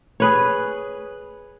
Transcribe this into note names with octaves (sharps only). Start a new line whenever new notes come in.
G#4 B4 C#5